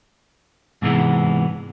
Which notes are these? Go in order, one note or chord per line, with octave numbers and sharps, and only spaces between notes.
G#2 C3 E3 G#3 B3